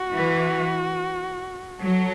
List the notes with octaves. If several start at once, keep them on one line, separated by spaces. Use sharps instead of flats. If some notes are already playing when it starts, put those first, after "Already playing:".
Already playing: F#4
E3
F#3 A4